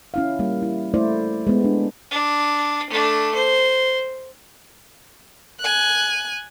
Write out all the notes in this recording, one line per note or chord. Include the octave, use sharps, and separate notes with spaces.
C#4 E4 F5
G3 A#3
E4
A3 E4 C5 D5
G#3 B3
D4
D4
A3 D4
C5
G#5 F#6